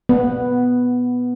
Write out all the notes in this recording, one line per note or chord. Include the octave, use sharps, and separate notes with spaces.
B3